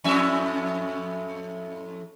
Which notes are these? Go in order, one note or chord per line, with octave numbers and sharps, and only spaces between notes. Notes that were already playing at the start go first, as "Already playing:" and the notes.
F2 A2 E5